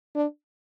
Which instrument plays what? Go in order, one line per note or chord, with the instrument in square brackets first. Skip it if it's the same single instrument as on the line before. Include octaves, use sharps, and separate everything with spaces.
[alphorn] D4